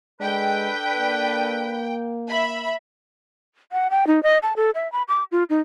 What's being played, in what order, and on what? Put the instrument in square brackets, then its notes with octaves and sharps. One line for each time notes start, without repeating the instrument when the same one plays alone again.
[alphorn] G#3 [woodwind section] D4 A4 B4 [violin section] G5
[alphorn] A#3
[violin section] E5 B5
[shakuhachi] F#5
G5
D#4
D#5
A5
A4
E5
B5
D6
F4
D#4